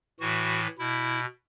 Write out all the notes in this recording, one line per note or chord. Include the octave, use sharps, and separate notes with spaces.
A2 E3 F#4
B2 E4